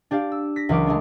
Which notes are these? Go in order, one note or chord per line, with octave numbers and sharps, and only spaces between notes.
D4 G4 D5 F5
E6
A#6 B6
C#2 E3 F#3 A#4 D6 D7
G#3 A3 D4